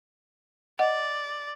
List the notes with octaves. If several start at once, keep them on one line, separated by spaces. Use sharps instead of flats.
D5 D#5 F#5